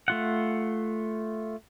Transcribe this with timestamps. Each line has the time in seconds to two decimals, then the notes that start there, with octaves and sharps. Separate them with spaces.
0.08 A3 F4 F#5